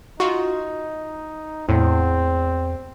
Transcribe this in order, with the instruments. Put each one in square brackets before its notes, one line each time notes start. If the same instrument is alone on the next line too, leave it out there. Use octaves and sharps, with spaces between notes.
[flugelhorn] D#4 [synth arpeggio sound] F4 F#4
[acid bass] E2 [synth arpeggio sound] A2 [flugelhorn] C4